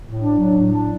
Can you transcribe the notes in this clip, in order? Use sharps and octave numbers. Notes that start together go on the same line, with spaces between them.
A2
D4
F#3
A2
D4